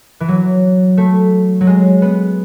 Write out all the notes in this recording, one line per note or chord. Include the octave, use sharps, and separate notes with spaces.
E3
F#3
A3
F#3
G#3
B3